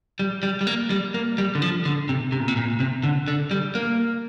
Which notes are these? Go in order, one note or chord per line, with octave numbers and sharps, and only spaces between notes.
G3
G3
G3
A#3
G3
A#3
G3
D3
F3
D3
C3
C3
A#2
C3
A#2
C3
D3
D3
G3
A#3